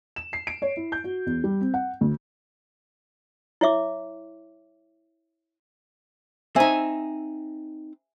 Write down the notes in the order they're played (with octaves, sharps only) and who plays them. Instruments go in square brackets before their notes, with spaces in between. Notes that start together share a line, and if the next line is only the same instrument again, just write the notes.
[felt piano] E7
C7
D7
C#5
E4
G6
F#4
E2
G3
C4
F#5
D2
[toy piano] E4 C#5 E5 D6
[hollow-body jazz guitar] C4 D#4 [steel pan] E5 G#5